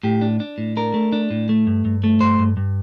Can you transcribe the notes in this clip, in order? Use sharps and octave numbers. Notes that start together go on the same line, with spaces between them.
A2 G4
D4
D4
A2
D4 A#4
A3
D4
A2
A3
G2
G2
A3
G2 C5
G2
G2